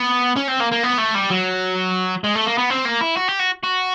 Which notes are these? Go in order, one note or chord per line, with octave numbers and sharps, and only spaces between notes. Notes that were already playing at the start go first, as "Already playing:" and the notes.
Already playing: B3
C#4
C4
A#3
A#3
B3
A3
G3
F#3
G#3
A3
A#3
B3
C4
A#3
E4
F#4
G4
F#4
F#4